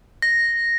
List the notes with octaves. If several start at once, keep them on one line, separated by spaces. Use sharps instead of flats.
A#6